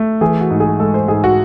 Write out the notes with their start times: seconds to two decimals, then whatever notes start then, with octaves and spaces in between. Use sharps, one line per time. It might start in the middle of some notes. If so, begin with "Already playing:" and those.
Already playing: A3
0.21 E3 G#4
0.41 F#4
0.51 G#2
0.60 G#4
0.80 G#3 A4
0.94 C5
1.08 G#2 G#4
1.24 F#4